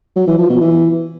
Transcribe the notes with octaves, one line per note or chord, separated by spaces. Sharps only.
F#3
E3
F3
B2
E3